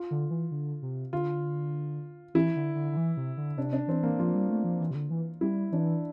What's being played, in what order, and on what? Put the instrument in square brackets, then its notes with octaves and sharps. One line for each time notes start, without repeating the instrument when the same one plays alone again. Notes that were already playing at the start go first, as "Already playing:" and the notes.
Already playing: [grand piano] F4
[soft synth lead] D3
E3
D3
C3
[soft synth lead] D3 [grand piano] F4
[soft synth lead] E3 [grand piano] E4
[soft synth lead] D3
D3
D3
E3
C3
D3
[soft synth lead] C3 [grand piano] D4
[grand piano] D4
[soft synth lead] E3 [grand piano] C4
[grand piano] A#3
[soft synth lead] F3 [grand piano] F4
[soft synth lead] G3
A3
F3
E3
C3
D3
E3
[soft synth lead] G3 [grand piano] E4
[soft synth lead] E3 [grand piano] D4